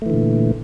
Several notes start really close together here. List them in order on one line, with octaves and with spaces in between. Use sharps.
A3 E3 D3 A#2